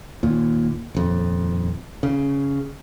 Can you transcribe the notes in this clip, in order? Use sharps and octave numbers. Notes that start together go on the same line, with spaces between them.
D#2 A#2
D#1 F2
C#3